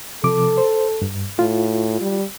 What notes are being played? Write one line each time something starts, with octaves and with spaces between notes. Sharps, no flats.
C3 F3 A4 D6
C5
G2
A2 F4
G3